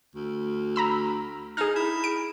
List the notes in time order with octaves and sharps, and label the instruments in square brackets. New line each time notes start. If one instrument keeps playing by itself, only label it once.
[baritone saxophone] D2
[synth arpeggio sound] A#5 B5 E6
[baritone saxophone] D#4 [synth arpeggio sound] G#4 F6
[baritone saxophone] E4
[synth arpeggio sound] D7